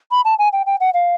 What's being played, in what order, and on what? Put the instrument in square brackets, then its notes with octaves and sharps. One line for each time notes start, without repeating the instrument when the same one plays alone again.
[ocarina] B5
A5
G#5
G5
G5
F#5
F5